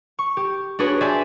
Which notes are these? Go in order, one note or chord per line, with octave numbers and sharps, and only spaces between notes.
C#6
G4
D4 F#4 G#4 B4 C#5
C5 D5 E5 G#5 A5